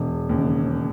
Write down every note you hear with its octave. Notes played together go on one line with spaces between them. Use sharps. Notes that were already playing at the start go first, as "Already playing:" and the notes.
Already playing: E1
D#2 C#3